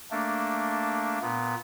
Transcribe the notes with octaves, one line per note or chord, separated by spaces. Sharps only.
A3 A#3 D4
A#2 B3